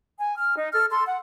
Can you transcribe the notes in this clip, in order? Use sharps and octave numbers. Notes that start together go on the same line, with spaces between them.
G#5
F6
D#4
A4 F6
A4 C6
F#5